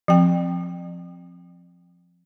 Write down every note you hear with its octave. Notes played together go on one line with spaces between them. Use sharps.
F3 C4 G5